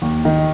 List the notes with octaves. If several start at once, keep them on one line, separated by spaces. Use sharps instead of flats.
D#2
D#3